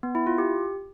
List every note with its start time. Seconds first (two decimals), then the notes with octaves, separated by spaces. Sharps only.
0.03 B3
0.15 E4
0.27 F4
0.38 G4